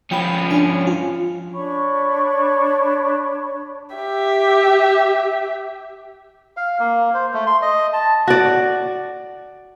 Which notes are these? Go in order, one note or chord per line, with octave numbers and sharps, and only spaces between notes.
F3 C#4 G5 B5
D4 C#5 G#5
F4
D4 C#5 B5 C#6
G4 E5
F5
A#3
C5
A3
C6
D#5
A5
F#4 D5